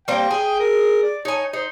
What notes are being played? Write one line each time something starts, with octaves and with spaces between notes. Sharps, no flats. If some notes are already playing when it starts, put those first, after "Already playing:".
G3 A#3 C4 G5
G#4
A#4
D5
D#4 C#5 G#5
D#4 C5